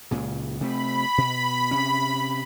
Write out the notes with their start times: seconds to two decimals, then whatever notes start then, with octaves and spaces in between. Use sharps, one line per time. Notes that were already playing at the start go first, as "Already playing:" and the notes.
0.11 C#2 A#2 C#3
0.61 C3 A3 C4 B5
1.18 B2
1.71 C3 C#4